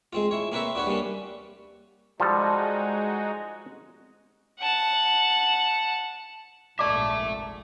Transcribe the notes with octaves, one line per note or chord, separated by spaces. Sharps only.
G#3 C4 F4
E4 C#5
A#3 C4 A#4 B4 C#5 E5
D4 F#4 B4 C#5
G3 A#3 C#4 D4
F3 G3 G#3 D#4 F#4 A4
F#5 A5
F1 A#1 G#2 D5 E5 A5 C#6 D6